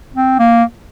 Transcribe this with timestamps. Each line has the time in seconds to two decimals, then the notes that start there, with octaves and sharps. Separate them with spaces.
0.16 C4
0.39 A#3